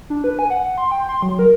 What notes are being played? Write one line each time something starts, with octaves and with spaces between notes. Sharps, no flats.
D4
B4
G#5
F#5
F#5
C6
G5
C6
F#3
A#4